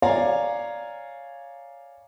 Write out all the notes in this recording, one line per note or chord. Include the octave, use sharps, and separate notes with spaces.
C#5 D5 F5 G#5 A#5